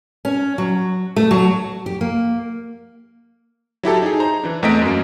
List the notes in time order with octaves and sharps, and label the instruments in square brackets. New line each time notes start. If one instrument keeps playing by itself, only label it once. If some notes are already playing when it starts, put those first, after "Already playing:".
[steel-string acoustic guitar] C#4
F#3
A3
F#3
G4
A#3
[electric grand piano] F#3 E4 G4 A4
D#4 G#4
C5 A#5
E3 D4
E2 A3 C4 D#5 B6 D7
F#2 A#3